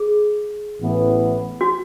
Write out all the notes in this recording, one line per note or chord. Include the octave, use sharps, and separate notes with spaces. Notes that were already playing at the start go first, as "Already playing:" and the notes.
Already playing: G#4
A1 A2 E3 B3
F#4